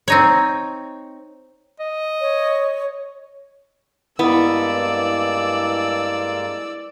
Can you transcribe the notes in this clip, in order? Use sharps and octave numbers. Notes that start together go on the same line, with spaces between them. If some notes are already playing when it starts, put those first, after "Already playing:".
C4 D#4 C#5
D#5
C#5
G2 G#3 A#3 B3 E4 D5 E6